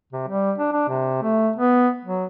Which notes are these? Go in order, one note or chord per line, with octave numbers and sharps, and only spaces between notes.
C3
G3
D4
D4
C3
A3
B3
F#3